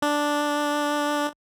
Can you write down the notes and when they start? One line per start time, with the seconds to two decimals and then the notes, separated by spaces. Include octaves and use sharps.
0.02 D4